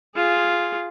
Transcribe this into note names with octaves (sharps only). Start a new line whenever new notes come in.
F4 G#4